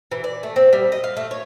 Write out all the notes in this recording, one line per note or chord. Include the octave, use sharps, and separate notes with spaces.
E3
D5
A3
C4
G3
D#5
F5
A3
C#5